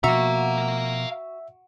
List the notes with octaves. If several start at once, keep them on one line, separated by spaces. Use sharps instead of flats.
B2 F3 F#4 E5 F5 A#5